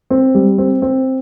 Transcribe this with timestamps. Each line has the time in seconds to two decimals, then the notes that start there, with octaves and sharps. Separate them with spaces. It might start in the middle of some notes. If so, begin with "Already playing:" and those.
0.10 C4
0.35 G3
0.58 C4
0.82 C4